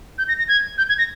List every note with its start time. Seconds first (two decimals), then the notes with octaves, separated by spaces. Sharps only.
0.18 G6
0.28 A#6
0.39 A#6
0.48 G#6
0.78 G6
0.89 G#6
0.98 A#6